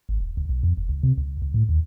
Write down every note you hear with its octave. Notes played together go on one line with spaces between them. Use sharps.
G#1
D#1
C#2
B1
F2
F1
C#2
C3
C#2
C#2
A2
D#2